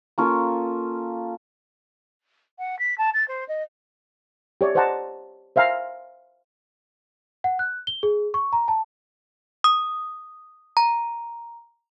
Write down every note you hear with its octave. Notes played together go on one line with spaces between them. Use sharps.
A#3 C#4 F4 A4
F#5
B6
A5
A6
C5
D#5
G4 C#5 D5 E5
C5 D5 D#5 F#5 A5 A#5
C5 E5 F5 G#5 A#5
F#5
F#6
G7
G#4
C#6
A#5
A5
D#6
A#5